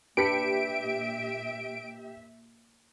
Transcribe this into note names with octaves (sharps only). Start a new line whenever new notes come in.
A#2 D4 G4 B4 E5 B6 C#7 D7